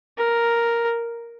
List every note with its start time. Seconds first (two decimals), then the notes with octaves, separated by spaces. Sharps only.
0.18 A#4